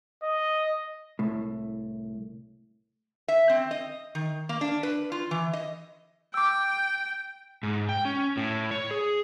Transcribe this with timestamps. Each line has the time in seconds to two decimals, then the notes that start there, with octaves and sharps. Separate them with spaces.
0.23 D#5
1.19 C2 A2
3.28 E5
3.50 C4
3.71 D#5
4.15 D#3
4.49 A#3
4.61 D4
4.83 B4
5.12 F4
5.31 E3
5.53 D#5
6.34 G5 D6 E6
7.63 G#2
7.89 G5
8.05 C#4
8.37 A2
8.71 C#5
8.91 G#4